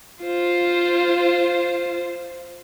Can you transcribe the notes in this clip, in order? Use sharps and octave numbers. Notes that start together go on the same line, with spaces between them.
F4 C5